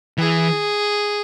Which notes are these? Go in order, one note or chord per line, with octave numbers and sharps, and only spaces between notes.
E3 G#4